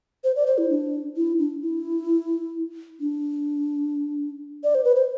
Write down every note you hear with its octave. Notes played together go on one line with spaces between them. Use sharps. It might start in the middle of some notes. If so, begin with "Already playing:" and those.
C5
D5
C5
E4
D4
E4
D4
E4
D4
D5
C5
B4
C5